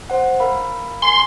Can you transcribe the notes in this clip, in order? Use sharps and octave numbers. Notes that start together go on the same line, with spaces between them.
C5 F#5
A#4 F5 B5
G#5 C6